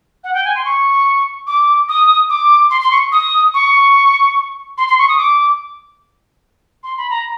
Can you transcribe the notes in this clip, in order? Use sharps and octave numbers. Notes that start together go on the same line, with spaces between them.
F#5
G5
G#5
C6
C#6
D6
D#6
D6
C6
C6
C#6
D#6
C#6
C6
C6
C#6
D#6
D6
C6
B5
A#5